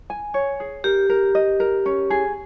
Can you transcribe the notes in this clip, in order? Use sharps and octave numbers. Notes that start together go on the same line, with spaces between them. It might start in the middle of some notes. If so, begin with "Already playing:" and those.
G#5
C#5
G#4
G4 A#4
A#4
D#5
A#4
C#4
G#4